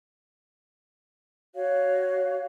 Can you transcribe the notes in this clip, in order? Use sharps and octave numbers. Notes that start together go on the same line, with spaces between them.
F#4 C#5 F5